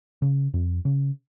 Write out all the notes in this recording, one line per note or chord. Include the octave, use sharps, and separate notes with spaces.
C#3
F2
C#3